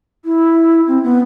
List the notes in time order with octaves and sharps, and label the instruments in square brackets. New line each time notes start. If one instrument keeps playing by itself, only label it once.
[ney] E4
C4
B3